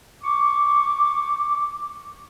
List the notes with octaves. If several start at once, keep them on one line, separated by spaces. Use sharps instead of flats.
C#6 D6